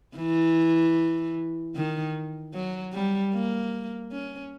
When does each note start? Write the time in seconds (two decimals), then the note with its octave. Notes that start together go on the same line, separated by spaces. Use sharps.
0.17 E3
1.76 D#3
2.54 F#3
2.93 G3
3.34 A#3
4.12 C#4